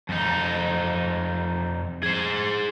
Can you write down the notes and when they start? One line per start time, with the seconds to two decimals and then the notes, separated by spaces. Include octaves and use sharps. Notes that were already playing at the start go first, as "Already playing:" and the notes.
0.09 F2 D#4
2.03 G#4 C5